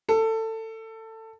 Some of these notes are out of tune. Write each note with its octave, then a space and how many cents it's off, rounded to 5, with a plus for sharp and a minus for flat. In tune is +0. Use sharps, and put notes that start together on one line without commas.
A4 +20